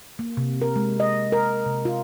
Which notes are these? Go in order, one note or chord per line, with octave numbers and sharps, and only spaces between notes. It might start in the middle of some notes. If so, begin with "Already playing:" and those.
A#3
C3
A#4
G#3
D#5
A#4
C3
F4